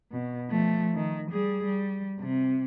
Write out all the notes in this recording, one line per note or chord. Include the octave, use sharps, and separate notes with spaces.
B2
F3 A3
D#3
G3 G#4
G3
C3